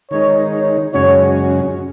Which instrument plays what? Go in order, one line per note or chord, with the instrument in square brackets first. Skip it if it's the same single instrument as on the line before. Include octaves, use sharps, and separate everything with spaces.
[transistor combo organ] D#3 G#3 D#4 [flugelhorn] C#5
[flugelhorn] C#5
[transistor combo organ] F#2 C#3 G#3 C#4 F#4 [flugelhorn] C#5